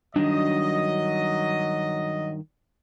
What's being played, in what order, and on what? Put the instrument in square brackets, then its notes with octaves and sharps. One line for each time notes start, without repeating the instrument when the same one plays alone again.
[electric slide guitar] G2 D#3 [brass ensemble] F#3 D#5 [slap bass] D4